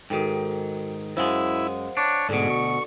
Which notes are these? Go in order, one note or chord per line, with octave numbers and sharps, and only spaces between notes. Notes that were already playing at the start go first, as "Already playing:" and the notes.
G#2 D#3 F#4 A4 G5
F#2 G#3 E4 C5 F5 F#5
D4 C#5
D2 G#2 B2 A4 D5
C#6